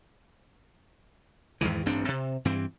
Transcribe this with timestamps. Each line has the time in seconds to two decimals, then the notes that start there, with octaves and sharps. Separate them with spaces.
1.61 E2 G#2 D#3 E3
1.86 A1 G2 C4 D4
2.08 C3
2.45 G2 E3 C4